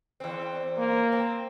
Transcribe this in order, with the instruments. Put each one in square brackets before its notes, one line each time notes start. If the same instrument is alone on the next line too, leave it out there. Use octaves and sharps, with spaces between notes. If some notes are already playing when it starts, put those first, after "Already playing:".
[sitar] E2 C4
[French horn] A#3
[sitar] C4